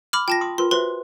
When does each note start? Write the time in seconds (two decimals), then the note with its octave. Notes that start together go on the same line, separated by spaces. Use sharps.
0.13 B5 D6 F6
0.28 F4 G5 A5 A#6
0.41 C6 D6 D#6
0.58 F4 A#4 B4 C6
0.71 F#4 B4 C5 E5 C6